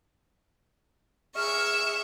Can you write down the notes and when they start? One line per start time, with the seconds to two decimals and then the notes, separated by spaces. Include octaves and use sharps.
1.36 G#4 E5 C#6 F6